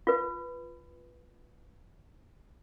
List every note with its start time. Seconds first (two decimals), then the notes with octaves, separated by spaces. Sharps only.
0.07 F4 B4